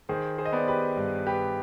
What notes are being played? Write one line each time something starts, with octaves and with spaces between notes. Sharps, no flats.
D#3 G#4 C5
G#4 C5
D#5
B3 D5
C5
G4 B4
G2
G4 B4